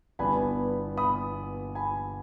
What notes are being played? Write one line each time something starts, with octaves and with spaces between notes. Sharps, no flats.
G1 G2 G3 B3 E4 G#5 B5
B5 D#6
G#5 B5